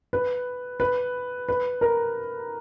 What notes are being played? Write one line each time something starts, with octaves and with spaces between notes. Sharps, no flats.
B4
B4
B4
A#4